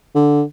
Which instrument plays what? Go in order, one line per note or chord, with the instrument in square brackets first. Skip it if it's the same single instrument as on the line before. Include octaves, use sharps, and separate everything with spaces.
[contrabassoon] D3